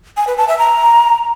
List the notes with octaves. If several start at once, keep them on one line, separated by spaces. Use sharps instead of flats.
G#5
B4
A5
E5
A#5